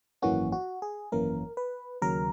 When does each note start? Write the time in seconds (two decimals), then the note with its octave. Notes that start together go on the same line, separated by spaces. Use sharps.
0.22 G#1 F#2 E3 A#3 C#4 F#4
0.52 F#4
0.82 G#4
1.12 G#1 F#2 E3 A#3 C#4 A#4
1.57 B4
2.02 D#2 C#3 F#3 A#4